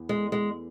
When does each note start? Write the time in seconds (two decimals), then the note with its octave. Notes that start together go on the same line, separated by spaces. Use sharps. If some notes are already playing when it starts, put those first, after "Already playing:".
Already playing: E2 B3
0.09 G#3
0.32 G#3